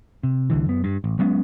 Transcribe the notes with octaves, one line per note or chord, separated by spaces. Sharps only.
C3
C2 D3 E3
F#2 B3
G2
A1
F#3 G#3 B3 C#4